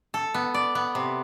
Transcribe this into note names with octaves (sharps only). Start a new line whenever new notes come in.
A4
B3
D5
B3
C3